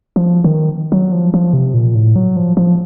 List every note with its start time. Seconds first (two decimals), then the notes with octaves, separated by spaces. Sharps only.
0.16 F3
0.44 D#3
0.92 F#3
1.12 F3
1.34 F3
1.53 C3
1.74 A#2
1.95 A2
2.16 F#3
2.36 F3
2.57 F3